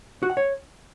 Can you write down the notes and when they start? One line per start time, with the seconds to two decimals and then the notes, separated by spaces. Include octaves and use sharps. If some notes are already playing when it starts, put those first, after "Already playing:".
0.23 F#4
0.30 F#5
0.37 C#5